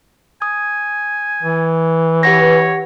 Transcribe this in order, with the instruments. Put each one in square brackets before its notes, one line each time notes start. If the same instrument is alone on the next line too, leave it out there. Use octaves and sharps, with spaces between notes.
[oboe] G#5 [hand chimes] D#6
[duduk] E3
[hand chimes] G4 F#5 A#6 [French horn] B4 [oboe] C#5